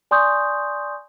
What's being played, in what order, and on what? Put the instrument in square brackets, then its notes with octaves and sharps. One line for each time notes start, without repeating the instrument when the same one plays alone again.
[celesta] D5 G#5 C6 C#6 D#6 G6